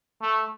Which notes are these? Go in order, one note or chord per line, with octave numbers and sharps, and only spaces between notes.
A3